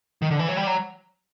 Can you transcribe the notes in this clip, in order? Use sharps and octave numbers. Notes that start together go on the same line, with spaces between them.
D#3
D3
E3
F#3
G3
F#3